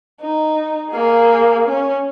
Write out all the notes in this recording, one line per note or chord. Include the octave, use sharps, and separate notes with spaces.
D#4
A#3 G#4
C#4